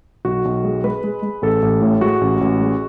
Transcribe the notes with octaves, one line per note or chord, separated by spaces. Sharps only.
B1 F#4
B1
G#3
G#3 B4
G#3
G#3
A1 A4
A1
A2
G#3 F#4
A1
A1
G#3